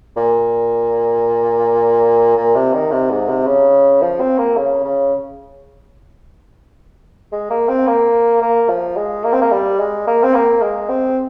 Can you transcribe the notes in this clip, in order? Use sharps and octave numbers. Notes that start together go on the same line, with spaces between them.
A#2
A#2
C3
D#3
C3
G#2
C3
C#3
F3
C4
A#3
C#3
C#3
G#3
A#3
C4
A#3
A#3
F3
G#3
A#3
C4
A#3
G3
G#3
A#3
C4
A#3
G#3
C4